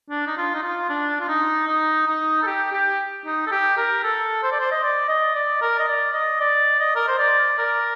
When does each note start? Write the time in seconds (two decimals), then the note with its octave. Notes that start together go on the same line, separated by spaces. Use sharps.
0.10 D4
0.27 D#4
0.37 F4
0.54 D#4
0.63 F4
0.89 D4
1.20 F4
1.28 D#4
1.68 D#4
2.07 D#4
2.42 A4
2.47 G4
2.72 G4
3.26 D#4
3.47 A4
3.51 G4
3.77 A#4
4.04 A4
4.43 C5
4.52 D5
4.60 C5
4.71 D#5
4.83 D5
5.08 D#5
5.35 D5
5.62 A#4
5.79 D#5
5.88 D5
6.13 D#5
6.40 D5
6.80 D#5
6.96 A#4
7.08 C5
7.19 D5
7.59 A#4